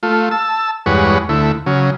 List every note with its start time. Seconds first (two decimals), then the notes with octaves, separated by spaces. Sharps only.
0.03 A3 F4
0.31 A5 E6
0.86 E2 G2 G#3 B4 C#5 F#5
1.29 D2 A3 E4
1.66 C#3 F#3